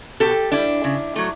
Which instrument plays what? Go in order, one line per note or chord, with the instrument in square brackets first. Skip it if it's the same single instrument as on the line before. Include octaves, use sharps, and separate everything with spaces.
[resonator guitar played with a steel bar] B2 G4 A4
G3 D4 E4
C#3
F#3 A3